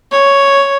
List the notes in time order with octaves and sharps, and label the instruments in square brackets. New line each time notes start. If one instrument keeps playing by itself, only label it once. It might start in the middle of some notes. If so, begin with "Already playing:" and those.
[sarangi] C#5